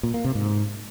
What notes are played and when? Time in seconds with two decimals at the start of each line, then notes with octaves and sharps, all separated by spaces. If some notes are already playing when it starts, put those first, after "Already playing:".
0.03 A#2
0.14 A#3
0.25 C3
0.35 G#2